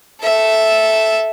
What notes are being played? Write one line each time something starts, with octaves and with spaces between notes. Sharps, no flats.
A4 E5